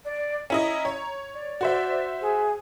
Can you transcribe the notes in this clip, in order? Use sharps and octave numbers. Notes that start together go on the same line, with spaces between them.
D5
C#4 E4 D#5 A#5
C#5
D5
F#4 C5 E5
G#4